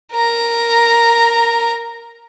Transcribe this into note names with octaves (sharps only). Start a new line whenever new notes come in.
A#4 A#5